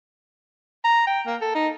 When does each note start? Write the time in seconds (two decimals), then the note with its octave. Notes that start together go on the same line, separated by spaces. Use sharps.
0.84 A#5
1.07 G5
1.27 A#3
1.41 A4
1.55 D#4